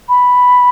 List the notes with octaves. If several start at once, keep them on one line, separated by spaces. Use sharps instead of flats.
B5